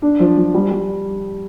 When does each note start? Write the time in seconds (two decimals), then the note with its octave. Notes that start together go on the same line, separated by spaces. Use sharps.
0.02 D4
0.20 F3
0.37 F3
0.54 G3
0.71 G3